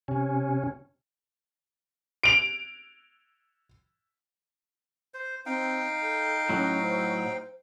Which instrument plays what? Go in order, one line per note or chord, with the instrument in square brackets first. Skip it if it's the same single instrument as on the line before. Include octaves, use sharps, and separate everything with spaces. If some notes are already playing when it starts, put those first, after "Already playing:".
[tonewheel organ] C3 C#4
[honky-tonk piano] D7 F7
[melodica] C5
[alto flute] C4 [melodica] D#4 F5 G5
[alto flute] A4
[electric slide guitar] A2 F#3 [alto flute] C#4
[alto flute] C5